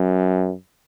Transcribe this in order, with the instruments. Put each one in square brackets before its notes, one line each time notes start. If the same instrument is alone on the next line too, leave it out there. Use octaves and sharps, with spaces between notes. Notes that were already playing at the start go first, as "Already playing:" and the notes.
Already playing: [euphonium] F#2